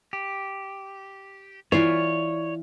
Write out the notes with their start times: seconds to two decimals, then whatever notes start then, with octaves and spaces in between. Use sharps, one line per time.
0.13 G4
1.72 E3 F4 C#5 D5 E5